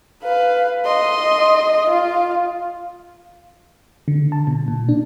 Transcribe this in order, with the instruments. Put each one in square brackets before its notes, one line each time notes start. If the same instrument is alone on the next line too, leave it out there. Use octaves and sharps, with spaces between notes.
[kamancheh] B4 F5
D#5 C6
F4
[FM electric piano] D3
A5
B2
A#2
D4